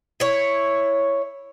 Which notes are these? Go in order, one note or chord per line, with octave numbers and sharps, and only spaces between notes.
E4 C#5